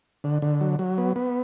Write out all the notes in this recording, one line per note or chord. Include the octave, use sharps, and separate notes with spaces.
D3
D3
F#3
F#3
B3
B3